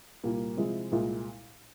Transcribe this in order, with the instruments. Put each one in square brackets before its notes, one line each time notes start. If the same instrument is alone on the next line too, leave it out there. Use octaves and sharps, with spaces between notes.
[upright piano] C2 A#2 G3 A#3
C3 F3 G#3 E4
C2 A#2 G#3 E4